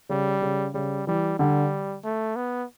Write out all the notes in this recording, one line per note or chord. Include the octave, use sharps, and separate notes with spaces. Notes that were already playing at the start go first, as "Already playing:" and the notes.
C#3 G3
C#3
C#3 G3
E3 G3
D3 G3
A3
B3